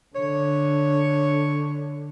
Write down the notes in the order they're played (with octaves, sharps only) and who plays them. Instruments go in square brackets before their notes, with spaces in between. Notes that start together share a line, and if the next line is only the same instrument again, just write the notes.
[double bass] D3 [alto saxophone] C#5